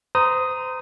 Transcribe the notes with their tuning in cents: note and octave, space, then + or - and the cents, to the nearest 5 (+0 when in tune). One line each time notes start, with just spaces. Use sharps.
C5 -30 A#5 +0 D#6 +5